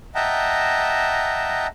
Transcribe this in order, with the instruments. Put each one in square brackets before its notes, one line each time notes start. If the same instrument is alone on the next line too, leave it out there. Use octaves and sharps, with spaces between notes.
[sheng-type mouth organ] D#5 E5 F#5 G5 A5 A#5